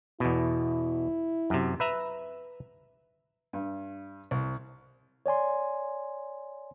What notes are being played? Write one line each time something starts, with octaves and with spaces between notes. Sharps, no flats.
E2 B2 E4
F#2 C3
B4 E5 A#5
G2
C2
C#5 D5 G#5 C6